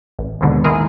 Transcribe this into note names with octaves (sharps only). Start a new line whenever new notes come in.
A1
D#2 G#2 B2 D3
D#3 G#3 E4 G#4 A#4